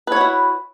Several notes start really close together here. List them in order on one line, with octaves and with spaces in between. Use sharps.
B4 C#5 F#4 E4